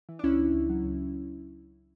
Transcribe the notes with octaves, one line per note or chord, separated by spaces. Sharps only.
E3
D4
C#2 C#4 E4
C#2
C#2
F#3
C#2